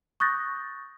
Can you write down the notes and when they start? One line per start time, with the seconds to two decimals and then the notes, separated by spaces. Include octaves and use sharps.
0.20 C#6 D#6 F#6 G6 A6 A#6